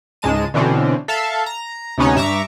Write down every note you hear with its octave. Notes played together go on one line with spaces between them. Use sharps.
C#2 G#2 G#3 A5 D#7
B2 D3 E3 C4 C#4
A4 E5 F5 A5
A#5
D2 C3 B3 C#4 D#4 C#5
G2 E5 A#5 C#6 D6